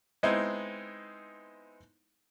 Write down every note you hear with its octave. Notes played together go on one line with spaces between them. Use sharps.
G#3 B3 C4 D#4 E4